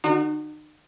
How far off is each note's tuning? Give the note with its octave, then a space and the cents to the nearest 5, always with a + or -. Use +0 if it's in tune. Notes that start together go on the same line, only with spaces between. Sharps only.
D3 +35 D#4 -35 F#4 +0